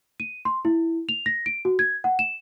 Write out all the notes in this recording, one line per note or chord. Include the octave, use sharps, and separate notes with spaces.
D#7
C6
E4
F7
A#6
D7
F#4
G#6
F#5
E7